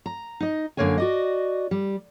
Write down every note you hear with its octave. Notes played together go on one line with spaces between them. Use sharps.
A#5
D#4 D#5
F#2 D3 E3 A#3 C#5 G#5
F#4 D5 D#5
G3